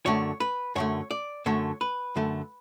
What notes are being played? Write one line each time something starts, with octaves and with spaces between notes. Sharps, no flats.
F#2 D3 A3 C#5
B4
F#2 D3 A3 C#5
D5
F#2 D3 A3 C#5
B4
F#2 D3 A3